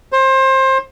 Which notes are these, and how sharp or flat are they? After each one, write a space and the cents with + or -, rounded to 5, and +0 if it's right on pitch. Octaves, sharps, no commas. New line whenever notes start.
C5 +25